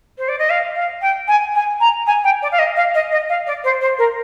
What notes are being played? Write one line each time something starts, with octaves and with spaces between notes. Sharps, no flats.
C5
D5
D#5
F5
F5
G5
G#5
G#5
A#5
G#5
G5
D5
F5
D#5
F5
D#5
D#5
F5
D5
C5
C5
A#4